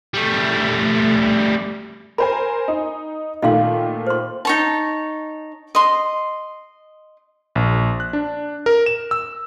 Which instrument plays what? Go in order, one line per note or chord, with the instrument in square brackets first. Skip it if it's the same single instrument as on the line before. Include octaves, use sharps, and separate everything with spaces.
[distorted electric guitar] G3 A3
[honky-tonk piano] A#4 C5 G#5 [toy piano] B5
[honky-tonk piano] D#4
[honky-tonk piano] A#2 D#3 A3 [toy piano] D#5 F5 C6
[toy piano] C5 C6
[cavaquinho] D#4 C#5 A5
D#5 C6
[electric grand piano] A#1
F#6
D4
A#4
E7
E6